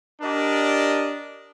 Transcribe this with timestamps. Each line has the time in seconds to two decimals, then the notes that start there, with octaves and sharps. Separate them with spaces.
0.22 D4 G4 A#4 D5 D#5